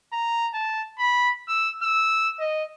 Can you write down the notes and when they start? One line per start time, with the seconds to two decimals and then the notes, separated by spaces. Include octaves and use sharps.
0.13 A#5
0.54 A5
0.99 B5
1.48 E6
1.82 E6
2.40 D#5